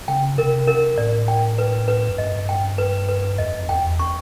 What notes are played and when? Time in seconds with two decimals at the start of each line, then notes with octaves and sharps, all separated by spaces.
0.08 C#3 G5
0.38 C3 A#4
0.67 A#4
0.98 A2 D5
1.28 G5
1.58 B4
1.88 B4
2.09 F#2
2.18 G2 D#5
2.49 G5
2.78 B4
3.08 B4
3.38 F2 D#5
3.69 E2 G5
3.99 C#6